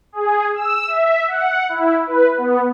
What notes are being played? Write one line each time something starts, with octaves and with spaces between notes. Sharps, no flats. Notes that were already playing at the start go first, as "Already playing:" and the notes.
G#4
E6
E5
F#5
E4
B4
B3